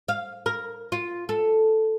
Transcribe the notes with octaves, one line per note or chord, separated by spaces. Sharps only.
F5
A#4
F4
A4